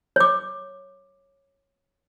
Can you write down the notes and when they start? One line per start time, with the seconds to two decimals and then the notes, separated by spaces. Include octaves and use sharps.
0.16 C#5 D6